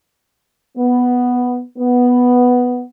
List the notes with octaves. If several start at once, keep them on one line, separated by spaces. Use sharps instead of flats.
B3
B3